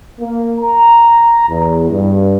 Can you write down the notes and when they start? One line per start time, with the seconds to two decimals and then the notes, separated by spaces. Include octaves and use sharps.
0.21 A#3
0.61 A#5
1.49 E2
1.91 G2